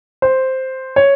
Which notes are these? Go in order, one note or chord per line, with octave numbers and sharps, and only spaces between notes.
C5
C#5